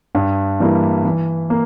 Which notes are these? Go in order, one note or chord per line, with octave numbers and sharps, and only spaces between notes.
G2
E3 G3 A#3 E4
E3
A#3